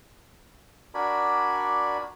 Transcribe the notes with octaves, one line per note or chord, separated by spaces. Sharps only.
D4 F#4 A#4 D5 G#5 B5